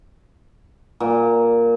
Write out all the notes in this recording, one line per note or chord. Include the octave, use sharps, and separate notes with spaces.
A#2